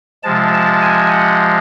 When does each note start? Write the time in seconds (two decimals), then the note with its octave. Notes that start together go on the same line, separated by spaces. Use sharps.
0.23 C3 F3 G#3 A5
0.53 A5
0.82 G#5
1.11 F#5